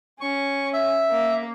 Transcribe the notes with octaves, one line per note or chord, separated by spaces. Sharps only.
C#4 C#6
E5
A#3